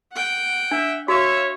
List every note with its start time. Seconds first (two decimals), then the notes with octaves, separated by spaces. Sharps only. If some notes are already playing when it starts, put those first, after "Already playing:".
0.12 F#5 G5
0.71 D4 E5
1.08 F#4 C#5 E5 F5